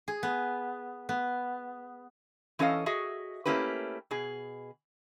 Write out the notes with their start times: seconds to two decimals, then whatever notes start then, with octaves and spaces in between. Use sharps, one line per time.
0.08 G#4
0.23 B3
1.09 B3
2.59 E3 C#4 A4 D#5 F5
2.86 F#4 G#4 D#5 E5
3.46 A3 A#3 C#4 E4 G4 B4
4.11 B2 G#4